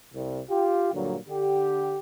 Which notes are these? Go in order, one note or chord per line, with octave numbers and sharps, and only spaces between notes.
C2
F4 G4
G2 A#2 D3 F#3
D3 G4